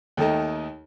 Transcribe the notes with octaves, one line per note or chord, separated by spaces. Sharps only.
D#2 D#3 A3 A4 D#5